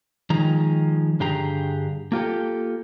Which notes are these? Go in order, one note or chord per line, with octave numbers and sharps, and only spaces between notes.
D#3 F3 G#3 A#5
G2 D3 G4 G#4 A#5
A#3 F4 G4 A4